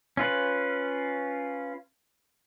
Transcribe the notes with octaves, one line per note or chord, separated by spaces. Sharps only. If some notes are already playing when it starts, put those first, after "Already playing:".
C#4 F4 B4